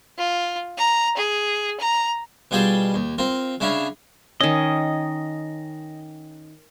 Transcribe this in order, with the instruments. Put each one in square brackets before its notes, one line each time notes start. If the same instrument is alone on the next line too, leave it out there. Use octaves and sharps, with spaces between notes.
[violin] F4
A#5
G#4
A#5
[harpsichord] B2 G3 F4 G#4 G5 A5
D#2
C4 F4 A#4
C#3 C#4 D4 E4 F5
[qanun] D#3 C#4 [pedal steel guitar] D#5